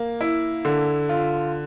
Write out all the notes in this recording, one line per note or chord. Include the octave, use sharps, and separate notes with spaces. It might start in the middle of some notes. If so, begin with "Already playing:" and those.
Already playing: A#3
E4
D3
F4